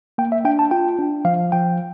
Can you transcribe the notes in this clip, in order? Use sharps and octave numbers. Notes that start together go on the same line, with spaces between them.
A#3 G5
E5
D4 G5
A5
F4 G5
D4
F3 F5
F3 G5